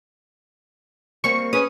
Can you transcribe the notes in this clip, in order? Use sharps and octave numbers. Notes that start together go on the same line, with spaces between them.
G3 A#3 C4 C#6
C#4 G#4 B4 D#6